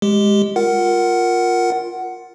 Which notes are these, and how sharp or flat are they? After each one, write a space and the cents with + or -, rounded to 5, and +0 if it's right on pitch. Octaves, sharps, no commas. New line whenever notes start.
G#3 +0 G4 +0
F4 +10 A#4 +0 F#5 +10